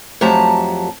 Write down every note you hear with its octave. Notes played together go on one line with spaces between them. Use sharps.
F2 F#3 A3 G4 A5 A#5